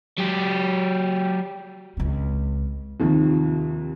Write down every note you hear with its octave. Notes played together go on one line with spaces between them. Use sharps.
F#3 G4
C#2 C4
D#2 C3 D#3 F3